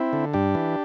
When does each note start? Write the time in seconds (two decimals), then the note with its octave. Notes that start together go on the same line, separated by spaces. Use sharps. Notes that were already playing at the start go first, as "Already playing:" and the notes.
Already playing: C4 E4
0.13 D3
0.34 G2 D4 G4
0.55 E3